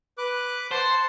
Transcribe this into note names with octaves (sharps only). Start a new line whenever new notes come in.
B4 D6 F#6
C5 F#5 A5 C6